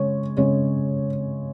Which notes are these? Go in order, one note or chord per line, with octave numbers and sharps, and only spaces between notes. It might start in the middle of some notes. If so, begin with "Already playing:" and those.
Already playing: C#3 G#3 C#5
C#3 G#3 C#5